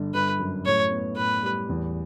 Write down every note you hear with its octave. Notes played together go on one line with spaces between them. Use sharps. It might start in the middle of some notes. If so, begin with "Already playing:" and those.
Already playing: G1 D3
G1 B4
F#2
A2 C#5
B3
A2 B4
G3
E2